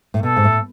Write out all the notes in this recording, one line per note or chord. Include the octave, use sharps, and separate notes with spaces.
A2
B2 A4
G#2
A2